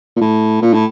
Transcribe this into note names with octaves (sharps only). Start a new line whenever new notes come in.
A#2
A2
A#2
A2